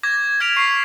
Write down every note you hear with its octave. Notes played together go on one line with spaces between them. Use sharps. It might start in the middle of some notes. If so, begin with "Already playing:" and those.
D6 G#6 A#6
F6 G#6 B6 D7 F7
C#6 C7